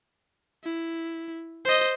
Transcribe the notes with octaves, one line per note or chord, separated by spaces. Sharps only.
E4
C5 D#5